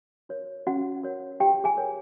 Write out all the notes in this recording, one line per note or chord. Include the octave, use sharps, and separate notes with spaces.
F#4 A#4 C#5
C#4 F#4 F#5
F#4 A#4 C#5
F4 G4 G5
G#4 G#5
A#4 C#5